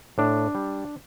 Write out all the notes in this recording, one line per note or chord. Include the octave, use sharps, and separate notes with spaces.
A2 D4
G3